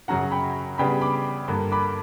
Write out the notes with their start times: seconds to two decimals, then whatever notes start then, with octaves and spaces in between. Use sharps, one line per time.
0.08 F#2 C#3 F#3 C#4 F#5 A#5
0.31 G5 B5
0.78 C#3 G3 B3 D4 G5 B5
1.01 B5 D6
1.48 G2 D3 A#3
1.72 B5 D6